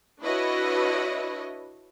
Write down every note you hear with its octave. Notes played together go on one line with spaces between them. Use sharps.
D4 E4 F#4 B4 C#5 D#5